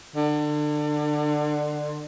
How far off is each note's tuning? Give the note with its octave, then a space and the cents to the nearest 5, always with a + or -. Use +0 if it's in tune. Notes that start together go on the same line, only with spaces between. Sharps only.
D3 +25